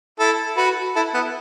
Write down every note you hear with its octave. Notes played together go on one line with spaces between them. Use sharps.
E4 A4
F#4 B4
E4 A4
B3 E4